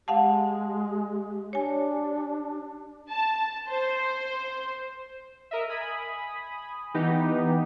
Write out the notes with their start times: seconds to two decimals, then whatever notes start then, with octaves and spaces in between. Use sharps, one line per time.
0.08 G#3 G4 F5 F#5 A5
1.53 D4 C#5 G#5
3.10 A5
3.69 C5
5.51 A#4 D#5 E5
5.69 G#5 B5 D#6
6.94 E3 B3 D#4 G4